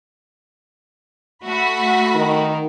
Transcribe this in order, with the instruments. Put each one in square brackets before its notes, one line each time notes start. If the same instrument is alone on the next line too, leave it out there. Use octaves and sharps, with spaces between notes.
[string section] A3 F#4 B5
[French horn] D#3